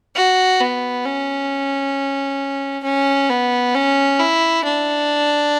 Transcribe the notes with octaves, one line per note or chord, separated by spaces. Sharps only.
F#4
B3
C#4
C#4
B3
C#4
E4
D4